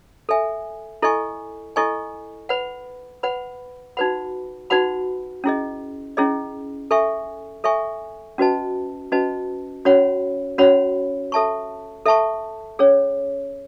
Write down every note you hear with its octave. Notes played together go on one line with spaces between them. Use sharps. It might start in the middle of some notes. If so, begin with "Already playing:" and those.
A4 E5 G#5
E4 A4 D#5 G#5 C#6
E4 A4 D#5 G#5 C#6
B4 F#5 B5
B4 F#5 B5
D#4 F#4 B4 F#5 B5
D#4 F#4 B4 F#5 B5
C#4 E4 G#4 D#5
C#4 E4 G#4 D#5
A4 E5 G#5 C#6
A4 E5 G#5 C#6
C#4 F#4 B4 D#5 A5
C#4 F#4 B4 D#5 A5
C#4 F#4 C#5 F#5 B5
C#4 F#4 C#5 F#5 B5
A4 E5 A5 C#6
A4 E5 A5 C#6
C#4 G#4 C#5